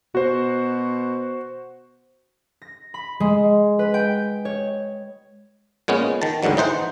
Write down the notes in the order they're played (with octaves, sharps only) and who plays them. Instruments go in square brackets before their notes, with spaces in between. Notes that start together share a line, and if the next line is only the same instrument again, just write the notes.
[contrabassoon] B2 [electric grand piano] F#4 C5
[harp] A#6
B5
G#3
B4
G5
C#5
[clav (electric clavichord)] A#2 G#3 B3 C#4
D#3 A5
D2 G#2 D3 D#3 F#3
E3 D#4 C5 F#5